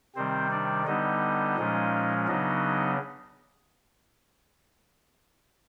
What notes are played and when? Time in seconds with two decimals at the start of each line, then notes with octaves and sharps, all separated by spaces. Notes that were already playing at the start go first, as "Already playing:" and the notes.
0.15 C3 D#3 G3 C4 C5
0.51 D4 D5
0.86 D3 G3 B3 D4 D#4 D#5
1.57 A#2 F3 G#3 C#4
2.27 C#3 F#3 B3 D4 D#4 D#5